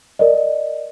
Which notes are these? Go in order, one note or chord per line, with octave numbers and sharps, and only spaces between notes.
A#4 D5 D#5